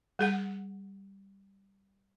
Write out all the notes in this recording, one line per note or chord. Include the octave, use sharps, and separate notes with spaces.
G3 G#4 F#5